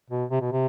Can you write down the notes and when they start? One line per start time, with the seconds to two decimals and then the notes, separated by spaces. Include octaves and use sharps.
0.10 B2
0.31 C3
0.42 B2
0.52 C3